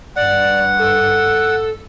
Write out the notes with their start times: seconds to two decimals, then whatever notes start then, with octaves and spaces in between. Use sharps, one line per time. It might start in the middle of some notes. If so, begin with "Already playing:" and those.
0.16 G2 D5 F#5
0.79 A4